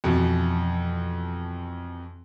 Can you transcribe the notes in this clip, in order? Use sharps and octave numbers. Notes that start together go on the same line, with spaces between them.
F2 B2 E3